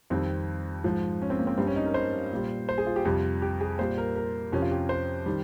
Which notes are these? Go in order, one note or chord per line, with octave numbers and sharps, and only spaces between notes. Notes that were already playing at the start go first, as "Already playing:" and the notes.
F2 D#3 G3 C4
G#2 F3
C#4
C4
A#3
C4
G2 G3 C4
C#4
D#4
A#4
C5
A#2 G3
C5
G#4
F4
G4
F2 C3 G3 F4
G4
G#4
A#2 G3 C5
A#4
A#4
F2 C3 F3 C#4
F4
G4
C5
D#3 G3